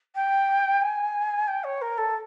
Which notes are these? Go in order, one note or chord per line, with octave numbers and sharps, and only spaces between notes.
G5
G#5
G5
C#5
A#4
A4